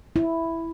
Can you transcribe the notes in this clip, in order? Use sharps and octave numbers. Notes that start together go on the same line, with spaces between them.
E4